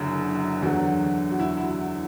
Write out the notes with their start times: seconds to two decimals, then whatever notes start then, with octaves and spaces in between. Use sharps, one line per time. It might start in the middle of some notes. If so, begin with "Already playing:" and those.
Already playing: F#1 F#2 D3
0.62 E2 D3 F#3 F#4
1.31 F#4
1.40 E4
1.57 E4